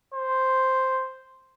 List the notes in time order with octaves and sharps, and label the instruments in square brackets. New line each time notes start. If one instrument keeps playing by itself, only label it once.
[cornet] C5